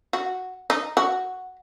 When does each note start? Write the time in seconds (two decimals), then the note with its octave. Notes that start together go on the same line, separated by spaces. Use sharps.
0.13 F#4
0.70 D#4
0.97 F#4